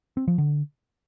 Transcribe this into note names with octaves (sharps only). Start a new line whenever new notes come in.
C4
F3
D3